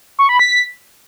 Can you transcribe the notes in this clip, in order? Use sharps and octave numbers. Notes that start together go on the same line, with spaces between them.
C#6
B5
B6